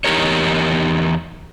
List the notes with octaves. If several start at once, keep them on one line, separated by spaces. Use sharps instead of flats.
E2 C3 D#4 G4 A#4 C#5